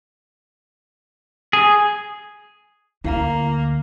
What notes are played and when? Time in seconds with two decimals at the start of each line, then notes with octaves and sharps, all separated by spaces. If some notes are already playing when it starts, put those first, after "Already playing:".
1.53 G#4
3.04 D2 A#3 E4 F5 A#5